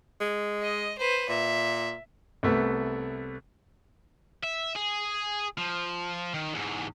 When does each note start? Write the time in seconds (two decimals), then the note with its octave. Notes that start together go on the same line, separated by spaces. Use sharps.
0.21 G#3
0.62 D#5
0.99 B4 C5
1.29 A#2 E5
2.43 C2 A3 B3
4.43 E5
4.75 G#4
5.58 F3
6.34 D#3
6.55 E2 G#2